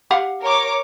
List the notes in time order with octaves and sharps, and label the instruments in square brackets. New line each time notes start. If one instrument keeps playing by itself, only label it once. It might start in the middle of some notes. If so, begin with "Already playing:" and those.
[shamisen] G4 F5 F#5
[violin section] A#4 C#5 D6